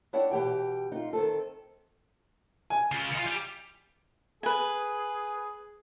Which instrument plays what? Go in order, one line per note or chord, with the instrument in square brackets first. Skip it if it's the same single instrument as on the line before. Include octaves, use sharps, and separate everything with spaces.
[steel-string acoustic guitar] B3 D4 E4 C#5 F#5 G5
B2 E3 G4 G5
D#4 F4
D#3 C4 A4
[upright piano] G#5
[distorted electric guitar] C#3 F4
D#4 F4
G3
[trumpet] G#4 [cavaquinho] B4 G#5